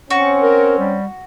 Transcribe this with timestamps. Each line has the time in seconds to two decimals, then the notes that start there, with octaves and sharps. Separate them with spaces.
0.10 C4 C#4 F#4 C#6
0.42 A#4
0.79 G3